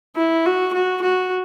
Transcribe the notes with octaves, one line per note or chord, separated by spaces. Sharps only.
E4
F#4
F#4
F#4